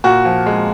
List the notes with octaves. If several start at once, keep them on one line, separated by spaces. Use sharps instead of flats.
A#2 F#4
F3
G#3